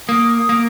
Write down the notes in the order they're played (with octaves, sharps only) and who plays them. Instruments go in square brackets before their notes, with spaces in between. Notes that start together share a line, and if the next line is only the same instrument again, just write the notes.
[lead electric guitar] A#3 [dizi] D#6
[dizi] D#6
[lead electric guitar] A#3